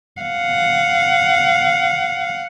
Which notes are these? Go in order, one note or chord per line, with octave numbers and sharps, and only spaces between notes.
F5 F#5